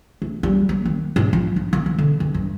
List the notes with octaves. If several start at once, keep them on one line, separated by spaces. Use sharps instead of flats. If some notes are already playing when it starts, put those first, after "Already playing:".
A3
G3
A#3
D#3
G#2
F3
D#4
D#3
E3
D3
E3
G2